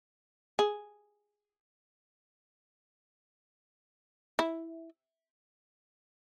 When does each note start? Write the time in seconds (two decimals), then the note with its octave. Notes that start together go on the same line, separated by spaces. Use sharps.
0.59 G#4
4.39 E4